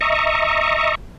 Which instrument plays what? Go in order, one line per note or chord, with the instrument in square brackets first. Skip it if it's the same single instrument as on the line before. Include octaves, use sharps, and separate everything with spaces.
[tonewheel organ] D#5 E5 A#5 C#6